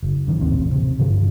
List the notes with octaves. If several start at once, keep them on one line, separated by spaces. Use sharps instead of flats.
F#1
F#2 D#3
D#1 A1 D#2 C4
C3
G2 D3 F3